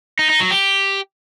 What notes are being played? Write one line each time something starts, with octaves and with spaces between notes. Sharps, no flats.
D#4
D#4
F#3
G4